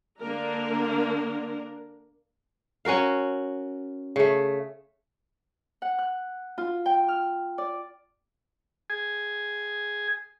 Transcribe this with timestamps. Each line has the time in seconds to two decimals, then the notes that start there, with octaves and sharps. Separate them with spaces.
0.20 D3 A#3 D4 A#4
2.85 C#4 F#4 A#4 F5
4.16 C#3 A3
5.82 F#5
5.98 F#6
6.58 F4
6.86 G5
7.08 F6
7.58 D5
8.90 G#4 G#5